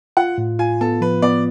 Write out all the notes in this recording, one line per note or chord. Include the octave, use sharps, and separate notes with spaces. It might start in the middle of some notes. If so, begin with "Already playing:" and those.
F4 F#5
A2
F4 G#5
B3 A4
F3 B4
B3 D5